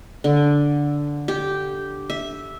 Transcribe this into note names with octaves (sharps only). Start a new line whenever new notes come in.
D3
G4
E5